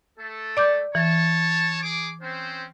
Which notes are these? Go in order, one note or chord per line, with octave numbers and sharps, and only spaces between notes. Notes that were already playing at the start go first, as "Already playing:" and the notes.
A3 A4
D5 D6 G6
E3 C#5 A5
G#4 D6
C4 C#4 C5